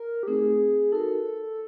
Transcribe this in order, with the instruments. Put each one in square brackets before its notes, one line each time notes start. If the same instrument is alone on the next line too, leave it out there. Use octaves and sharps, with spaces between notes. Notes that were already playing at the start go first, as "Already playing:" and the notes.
Already playing: [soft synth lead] A#4
G4
[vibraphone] A3 C4 D#4 [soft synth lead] G#4
[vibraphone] D#4 F#4 A#4 [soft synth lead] A4